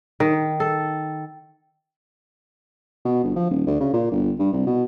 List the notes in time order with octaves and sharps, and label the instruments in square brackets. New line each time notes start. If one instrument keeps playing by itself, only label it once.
[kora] D#3
A4
[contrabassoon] B2
G1
F3
D#1
D2
C#3
A#2
G1
G2
C2
B2